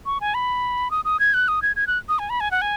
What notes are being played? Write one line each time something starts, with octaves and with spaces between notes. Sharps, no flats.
C#6
G#5
B5
D#6
D#6
G#6
F#6
D#6
G#6
G#6
F#6
D#6
G#5
B5
G#5
F#5
G#5